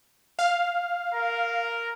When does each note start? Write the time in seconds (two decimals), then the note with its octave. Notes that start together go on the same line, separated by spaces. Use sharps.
0.39 F5
1.14 A#4